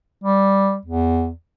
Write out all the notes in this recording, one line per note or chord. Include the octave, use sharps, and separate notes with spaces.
G3
E2